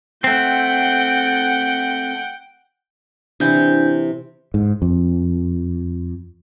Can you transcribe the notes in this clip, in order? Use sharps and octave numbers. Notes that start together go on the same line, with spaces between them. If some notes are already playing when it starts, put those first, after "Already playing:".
A3 C4 F#5 G5
C3 E3 D4 E4 G6
G#2
F2